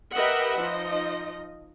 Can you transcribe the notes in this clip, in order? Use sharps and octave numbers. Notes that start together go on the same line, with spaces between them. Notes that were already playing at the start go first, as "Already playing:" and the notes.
G4 A#4 B4 D#5 E5 F#5
F3 D#4 D#5